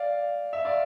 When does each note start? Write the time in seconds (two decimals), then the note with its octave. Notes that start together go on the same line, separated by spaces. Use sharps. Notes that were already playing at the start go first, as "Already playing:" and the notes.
Already playing: D5 F5
0.53 E5
0.65 D5 F5